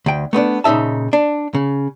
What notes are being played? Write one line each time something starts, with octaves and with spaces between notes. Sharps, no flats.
D2 G5
A3 B3 C4 D4
A#2 C#3 D#4 E5 A5
D4
C#3